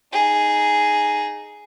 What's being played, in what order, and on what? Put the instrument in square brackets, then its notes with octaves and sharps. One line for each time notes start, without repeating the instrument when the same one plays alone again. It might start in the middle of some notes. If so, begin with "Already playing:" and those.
[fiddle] D#4 G#4